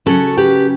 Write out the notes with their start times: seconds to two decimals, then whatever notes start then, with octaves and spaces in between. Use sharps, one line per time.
0.06 C#3 F#3 C#4 F#4 A4
0.37 G4 B4